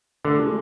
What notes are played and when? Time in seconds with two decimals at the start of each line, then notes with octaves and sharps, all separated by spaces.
0.24 D3 A3
0.39 G#3